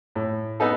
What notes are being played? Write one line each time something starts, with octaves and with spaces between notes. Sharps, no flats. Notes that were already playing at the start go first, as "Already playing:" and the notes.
A2
B3 D#4 A4